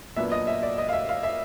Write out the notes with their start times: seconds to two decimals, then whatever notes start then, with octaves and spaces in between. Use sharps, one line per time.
0.16 A#2 F#3 B3 D4 E5
0.32 D#5
0.47 E5
0.63 D5
0.78 D#5
0.89 F5
0.93 E5
1.09 F5
1.23 E5